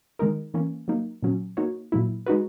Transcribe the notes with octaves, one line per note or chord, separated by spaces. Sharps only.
D#3 G#3 D#4 A#4
E3 A#3 C#4
F#3 A#3 D#4
A#2 F#3 C#4
A#3 D#4 F#4 C#5
A#2 F#3 A#3 E4
G#3 D#4 F#4 B4